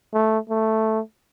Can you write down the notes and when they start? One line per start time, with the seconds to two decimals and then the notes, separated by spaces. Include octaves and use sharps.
0.14 A3
0.50 A3